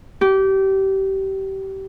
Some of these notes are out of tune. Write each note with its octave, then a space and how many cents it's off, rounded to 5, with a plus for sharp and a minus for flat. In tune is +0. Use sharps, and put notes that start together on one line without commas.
G4 -25